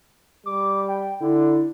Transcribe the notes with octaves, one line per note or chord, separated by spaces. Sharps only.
G3 D6
G5
D3 E4